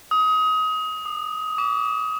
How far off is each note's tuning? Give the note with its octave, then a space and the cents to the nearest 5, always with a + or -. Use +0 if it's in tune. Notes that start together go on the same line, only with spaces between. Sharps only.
D#6 +25
D#6 -40
D6 -40